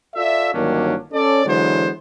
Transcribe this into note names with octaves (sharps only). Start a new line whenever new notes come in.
F4 A4 D5 E5
G1 D#3 F#3 A#3 C#4 D4
C#4 A4 D5
D3 E3 F#3 G#3 B3 C5